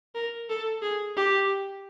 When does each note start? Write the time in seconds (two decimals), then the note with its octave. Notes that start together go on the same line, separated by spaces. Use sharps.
0.15 A#4
0.49 A4
0.82 G#4
1.17 G4